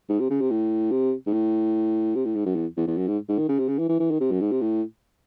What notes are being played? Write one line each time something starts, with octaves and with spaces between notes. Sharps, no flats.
G#2
C3
C#3
C3
A2
C3
G#2
A2
C3
A2
G#2
F#2
E2
E2
E2
F#2
G#2
G#2
D#3
C#3
C3
C#3
E3
E3
E3
D#3
C3
F#2
G#2
C3
A2